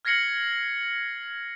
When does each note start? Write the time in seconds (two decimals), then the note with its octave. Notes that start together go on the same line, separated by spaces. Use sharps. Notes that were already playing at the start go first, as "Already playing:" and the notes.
0.05 F6 G#6 A#6 C7 C#7 F#7